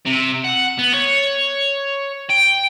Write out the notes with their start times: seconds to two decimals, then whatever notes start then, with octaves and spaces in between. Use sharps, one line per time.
0.06 C3
0.45 F#5
0.79 B3
0.94 C#5
2.30 G5